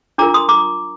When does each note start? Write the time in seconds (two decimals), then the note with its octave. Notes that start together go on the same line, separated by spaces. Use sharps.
0.18 D4 F4 A#4 A#5 D6
0.34 C6 D#6
0.49 A#5 D6